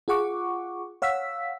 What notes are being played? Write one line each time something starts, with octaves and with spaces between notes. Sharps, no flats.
F4 G#4 F#5 C#6 D6
C#5 F5 F#5 E6 B6